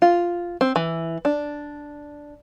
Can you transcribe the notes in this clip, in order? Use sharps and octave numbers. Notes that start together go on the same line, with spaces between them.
F4
C4
E3
D4